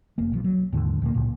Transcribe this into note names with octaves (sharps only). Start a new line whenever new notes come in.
F1 A#3
B1 A#2 F3
F#3
D#2 G#2 D3
D2 A#2 A#3
C#2 A#2